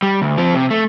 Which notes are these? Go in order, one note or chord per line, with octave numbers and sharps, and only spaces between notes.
G3
D2
F3 C4
C3
A3